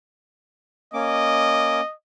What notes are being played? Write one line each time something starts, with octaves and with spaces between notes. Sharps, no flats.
A#3 C#4 D#5 D6